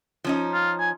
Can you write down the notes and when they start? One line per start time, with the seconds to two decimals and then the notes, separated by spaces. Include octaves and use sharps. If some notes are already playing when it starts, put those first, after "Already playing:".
0.24 F3 C#4 D#4
0.53 F4
0.80 G#5